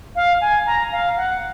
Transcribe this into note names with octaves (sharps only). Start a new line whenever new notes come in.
F5
G#5
A#5
F5
F#5